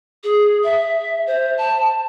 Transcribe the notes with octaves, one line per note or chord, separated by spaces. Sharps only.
G#4
E5
C5
A5